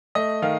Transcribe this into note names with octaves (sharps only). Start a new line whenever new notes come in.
A3 D#5
D#3 F5